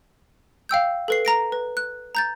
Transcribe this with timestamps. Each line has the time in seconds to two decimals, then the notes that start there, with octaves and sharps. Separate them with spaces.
0.69 F5 G5 E6 G6
1.08 A4 B4 C7
1.25 A#5 A#6 D7
1.52 B4
1.77 F#6
2.15 A#5 G6 A6